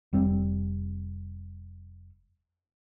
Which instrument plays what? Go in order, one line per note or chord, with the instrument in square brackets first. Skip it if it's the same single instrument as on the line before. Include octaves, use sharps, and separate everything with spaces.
[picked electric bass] F1 G3 C4